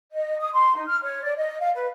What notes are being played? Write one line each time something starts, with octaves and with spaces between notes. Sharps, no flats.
D#5
D#6
C6
D#4
F6
C#5
D5
D#5
F5
B4